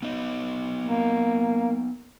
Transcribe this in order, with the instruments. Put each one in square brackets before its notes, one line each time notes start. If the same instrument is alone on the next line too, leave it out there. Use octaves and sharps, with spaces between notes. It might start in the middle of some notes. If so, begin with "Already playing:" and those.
[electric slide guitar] B3 D#4 D#5
[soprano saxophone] A#3